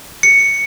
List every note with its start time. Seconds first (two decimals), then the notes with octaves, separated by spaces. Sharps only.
0.23 C#7